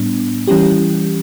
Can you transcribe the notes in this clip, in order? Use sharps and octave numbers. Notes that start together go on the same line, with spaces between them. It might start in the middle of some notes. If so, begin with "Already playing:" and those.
Already playing: A2 G3 B3 D4
E3 G3 C#4 E4 G4